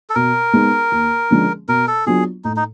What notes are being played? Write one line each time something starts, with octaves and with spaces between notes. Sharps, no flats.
A4
B2 A#4
G#3 B3 D#4 G#4
D#2
D3 F3 G#3 C#4
B2 A#4
A4
F#3 B3 D4 F4 G#4
A2 D#4
D#4